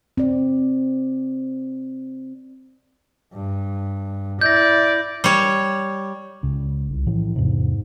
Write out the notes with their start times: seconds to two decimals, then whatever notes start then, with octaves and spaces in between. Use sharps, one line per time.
0.17 C4 D5
3.33 G2
4.41 E4 D5 G6 A#6
5.24 G3 C#5
6.43 C#2 C#3
6.90 C2
7.07 B1 A2 E3 F3
7.36 E2 G#2 C3